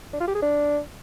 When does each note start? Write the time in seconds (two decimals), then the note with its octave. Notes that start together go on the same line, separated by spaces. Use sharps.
0.13 D4
0.20 F4
0.28 G4
0.35 G#4
0.42 D4